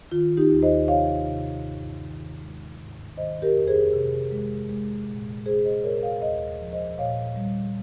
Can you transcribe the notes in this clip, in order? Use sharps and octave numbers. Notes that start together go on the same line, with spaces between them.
D#3 F4
D#4 G4
D#2
C5 D#5
C3 C#5 F5
C3
G2
D#3
G#3
G#2
D#3 C5 D#5
G4 A#4
F2
G#4 C5
C3
G#3
G#3
A#2
G#3 G#4 C5
C5 D#5
A#2 A#4 C#5
C#5 F5
D#2 C5 D#5
F3
C5 D#5
A#2 C#5 F5
G3